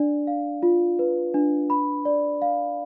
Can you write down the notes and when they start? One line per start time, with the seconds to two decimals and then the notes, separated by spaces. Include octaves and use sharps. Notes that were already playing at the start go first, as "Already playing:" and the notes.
Already playing: D4 D5
0.27 F5
0.63 F4
0.99 B4
1.34 D4
1.70 B5
2.05 D5
2.42 F5